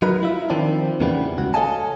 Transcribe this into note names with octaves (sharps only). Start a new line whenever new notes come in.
F#3 D#4 A#4 B4
E4 F4 E5
D#3 F3 C4 D4
E2 A#2 C#3 E3 G3 B3
C#2 F#4
A4 C#5 D#5 F5 G#5 A5